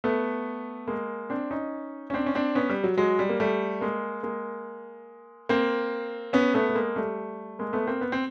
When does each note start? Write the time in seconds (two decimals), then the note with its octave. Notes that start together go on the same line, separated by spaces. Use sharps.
0.04 A3 B3
0.87 G#3 A#3
1.30 C4 D4
1.51 C#4 D#4
2.10 C#4
2.14 C4 D4
2.26 C#4
2.35 C4 D4
2.55 B3 C#4
2.69 G3
2.84 F#3
2.97 F#3 G#3
3.19 G3
3.29 A#3
3.40 G3 A3
3.81 G#3 A#3
4.23 G#3 A#3
5.49 A#3 C4
6.33 B3 C#4
6.54 A3 B3
6.69 A3
6.75 G#3 A#3
6.96 G3 A3
7.59 G#3 A#3
7.73 A3 B3
7.87 A#3 C4
8.01 B3
8.12 C4